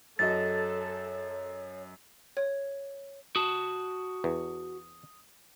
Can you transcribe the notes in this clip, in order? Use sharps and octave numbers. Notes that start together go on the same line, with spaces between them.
F#2 F#4 A4 C#5 D#5 A6
C#5
F#4 A5 D#6
E2